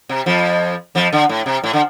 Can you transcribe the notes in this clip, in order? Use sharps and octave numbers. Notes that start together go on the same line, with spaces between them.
C3
F2 F3
F2 F3
D3
A2
C3
A2
D3